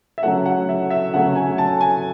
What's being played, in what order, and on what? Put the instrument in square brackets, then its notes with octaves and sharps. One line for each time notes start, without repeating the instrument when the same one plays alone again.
[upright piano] E5
C#3 F#3 A3 F#5
F#5
E5
E5
C#3 F#3 A3 F#5
G#5
A5
G#5